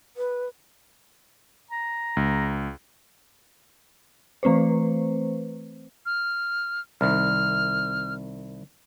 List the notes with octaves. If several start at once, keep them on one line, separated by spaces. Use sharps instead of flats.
B4
A#5
C#2
E3 A3 C4 B4 C5
F6
C2 D#3 F6